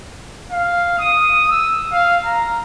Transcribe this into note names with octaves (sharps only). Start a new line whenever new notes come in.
F5
D#6
E6
F5
A#5